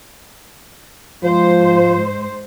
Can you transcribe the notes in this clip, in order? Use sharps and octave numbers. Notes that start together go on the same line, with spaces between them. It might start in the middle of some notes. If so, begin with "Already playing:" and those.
G#2 F3 C5